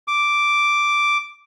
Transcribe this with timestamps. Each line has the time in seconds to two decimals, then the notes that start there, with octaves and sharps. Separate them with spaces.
0.08 D6